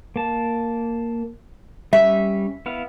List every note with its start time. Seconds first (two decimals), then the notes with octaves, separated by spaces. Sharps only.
0.16 A#3 A5
1.93 G3 C#4 E5
2.66 B3 E4 F5